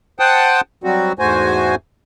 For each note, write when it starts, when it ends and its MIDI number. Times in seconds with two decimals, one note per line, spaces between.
0.20 0.61 72
0.20 0.61 78
0.20 0.61 79
0.20 0.61 81
0.20 0.61 87
0.84 1.13 54
0.84 1.13 55
0.84 1.13 60
0.84 1.13 66
1.19 1.75 40
1.19 1.75 44
1.19 1.75 57
1.19 1.75 66
1.19 1.75 72
1.19 1.75 80